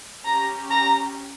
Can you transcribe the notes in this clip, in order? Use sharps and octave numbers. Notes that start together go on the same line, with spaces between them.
C#4 G4 A#5
A#5